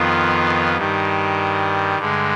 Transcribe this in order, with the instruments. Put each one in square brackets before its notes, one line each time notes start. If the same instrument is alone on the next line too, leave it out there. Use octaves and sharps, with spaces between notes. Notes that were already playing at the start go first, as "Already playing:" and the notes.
Already playing: [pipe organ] F2 D#3 B3 F4
G2 D#3 G3
G2 D3 G#3